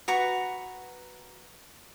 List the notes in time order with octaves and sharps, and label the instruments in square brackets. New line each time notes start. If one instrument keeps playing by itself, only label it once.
[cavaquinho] F#4 B4 A#5 C#6